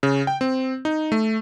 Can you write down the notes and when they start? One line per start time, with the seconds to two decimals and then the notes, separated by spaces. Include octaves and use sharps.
0.03 C#3
0.27 G5
0.41 C4
0.85 D#4
1.12 A3